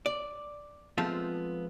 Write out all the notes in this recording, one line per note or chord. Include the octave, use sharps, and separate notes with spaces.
D5
F3 G#3 A3 B3 C4 F4